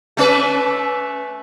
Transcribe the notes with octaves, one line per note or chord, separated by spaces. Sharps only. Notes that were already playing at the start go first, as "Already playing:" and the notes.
A3 C#4 B4